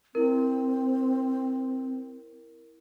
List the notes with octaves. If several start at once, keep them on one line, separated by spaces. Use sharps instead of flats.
C4 E4 A#4